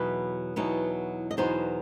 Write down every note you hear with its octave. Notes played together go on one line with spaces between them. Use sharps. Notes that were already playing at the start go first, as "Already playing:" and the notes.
Already playing: E2 B2 F#3 B3 D#4 B4
E2 B2 F#3 B3 D#4
D#5
E2 B2 F#3 B3 D#4 C5